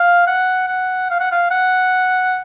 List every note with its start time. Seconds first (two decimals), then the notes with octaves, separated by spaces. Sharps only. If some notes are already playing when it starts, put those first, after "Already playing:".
Already playing: F5
0.27 F#5
0.68 F#5
1.10 F5
1.20 F#5
1.32 F5
1.51 F#5